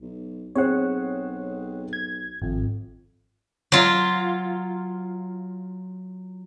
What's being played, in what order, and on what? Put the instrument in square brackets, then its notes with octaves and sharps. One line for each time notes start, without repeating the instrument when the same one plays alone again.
[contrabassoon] B1
[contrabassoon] B1 [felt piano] C4 G#4 C5 [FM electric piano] C#5 F#5
[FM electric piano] G#6
[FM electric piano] G#1 [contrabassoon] F2
[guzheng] F#3 F4